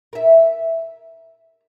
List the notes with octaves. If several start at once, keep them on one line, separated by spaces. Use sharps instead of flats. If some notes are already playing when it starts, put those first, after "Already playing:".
A#4 E5